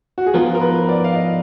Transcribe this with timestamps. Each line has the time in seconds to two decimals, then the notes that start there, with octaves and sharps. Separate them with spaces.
0.18 F#4
0.26 G#4
0.34 G#2 F3 B3 F4 A#4
0.55 A#4
0.61 B4
0.89 D5
1.04 F5
1.15 D#5